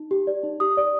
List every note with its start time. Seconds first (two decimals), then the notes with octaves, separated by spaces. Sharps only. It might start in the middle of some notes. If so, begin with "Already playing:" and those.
Already playing: D#4
0.11 G4
0.27 D5
0.43 D#4
0.60 G4 D#6
0.77 D5